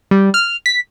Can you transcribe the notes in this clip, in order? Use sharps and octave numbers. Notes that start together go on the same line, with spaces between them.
G3
F6
B6